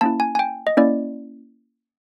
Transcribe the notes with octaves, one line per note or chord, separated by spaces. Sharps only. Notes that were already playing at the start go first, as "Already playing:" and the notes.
A#3 C#4 E4 A5
G#5
G#5
G5
D#5
A#3 C#4 E4 D5